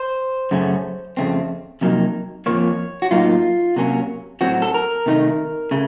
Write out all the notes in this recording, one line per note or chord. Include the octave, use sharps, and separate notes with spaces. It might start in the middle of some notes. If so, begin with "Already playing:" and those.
Already playing: C5
F#2 C#3 A3 C#4
F2 C#3 A3 C4
F2 C3 F#3 A#3 D#4
F2 C3 F3 A#3 C#5
F#4
A2 F#3 A#3 D#4 F4
C3 F#3 A#3 C#4
A2 F#3 C4 F#4
A4
A#4
C3 D#3 A3 D#4
C#3 A3